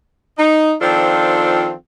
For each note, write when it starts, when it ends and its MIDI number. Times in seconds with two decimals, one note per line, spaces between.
0.38 0.73 63
0.82 1.74 51
0.82 1.74 53
0.82 1.74 60
0.82 1.74 62
0.82 1.74 65
0.82 1.74 69